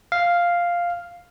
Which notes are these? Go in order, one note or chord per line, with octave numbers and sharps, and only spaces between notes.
F5